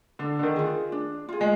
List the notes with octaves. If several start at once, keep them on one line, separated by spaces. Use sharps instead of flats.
D3 D4
D3
D#3
F4 G#4
D4
F4 G#4
G#3